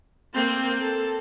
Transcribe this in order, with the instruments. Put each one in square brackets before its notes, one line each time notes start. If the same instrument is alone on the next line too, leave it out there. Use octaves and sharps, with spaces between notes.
[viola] A#3 C4
A4